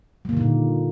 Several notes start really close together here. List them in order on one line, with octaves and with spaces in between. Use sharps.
G3 A#3 D3 D#3 A#2